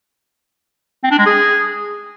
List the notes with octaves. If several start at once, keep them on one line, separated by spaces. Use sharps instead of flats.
C4
D4
G#3
G#4